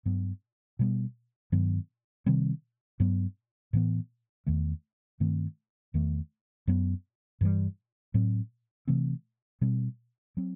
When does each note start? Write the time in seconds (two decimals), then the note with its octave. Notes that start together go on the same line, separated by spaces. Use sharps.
0.06 G2 F#3 B3
0.79 B2 G3 B3
1.52 G2 D#3 F#3 B3
2.26 C3 D#3 G3 C4
3.00 G2 F#3 B3
3.73 A2 E3 B3
4.46 E2 D#3 A3
5.20 G2 D#3 A3 C4
5.94 E2 D#3 A3
6.67 F#2 F#3 B3
7.41 G2 E3 G3
8.14 A2 F#3 C4
8.88 C3 E3 A3 C4
9.61 B2 G3 C4
10.37 F#3 C4